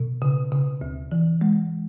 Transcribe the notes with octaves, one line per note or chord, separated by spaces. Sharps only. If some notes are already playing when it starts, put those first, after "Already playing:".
Already playing: B2
C#3
C#3
D2
E3
G#3